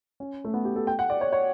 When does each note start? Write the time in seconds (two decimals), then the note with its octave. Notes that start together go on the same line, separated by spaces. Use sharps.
0.20 C#4
0.45 A3
0.54 B3
0.65 G4
0.76 A4
0.87 G5
0.99 F#5
1.10 D5
1.21 C#5
1.33 C#5